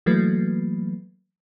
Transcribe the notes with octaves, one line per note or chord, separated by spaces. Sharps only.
E3 F#3 A3 A#3 B4